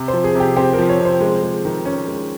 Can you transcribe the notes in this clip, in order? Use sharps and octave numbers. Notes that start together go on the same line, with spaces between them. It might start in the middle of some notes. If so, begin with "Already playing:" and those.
Already playing: C3
C5
F3
G#4
C3
G4
C4 G4
A#4
F3
C#5
C3
C5
G#3
G#3
D#3
C#4
G#3